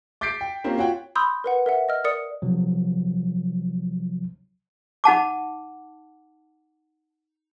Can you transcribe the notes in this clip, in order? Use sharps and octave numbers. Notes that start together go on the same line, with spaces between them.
D6 G6 A6 B6 C7 D7
G5
A#3 C4 C#4 F4 G4
F4 F#4 C#5 F#5 G5
B5 C6 D#6 E6 G6
A#4 B4 F#5
A#4 E5 F#5
D#5 E6 F6
A#4 D5 D#6 C#7
C3 F3 F#3
D#4 F#5 A5 D6